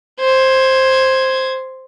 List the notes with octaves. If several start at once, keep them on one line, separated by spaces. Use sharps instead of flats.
C5 G#6